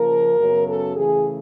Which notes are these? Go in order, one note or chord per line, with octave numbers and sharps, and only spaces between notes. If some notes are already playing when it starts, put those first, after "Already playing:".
Already playing: C#3 F3 A#3 A#4
F#2 C#3 F#3 B3
A4
C#3 E3 A3 G#4